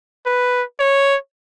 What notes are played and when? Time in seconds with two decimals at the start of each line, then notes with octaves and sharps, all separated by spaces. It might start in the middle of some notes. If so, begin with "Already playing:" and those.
0.26 B4
0.79 C#5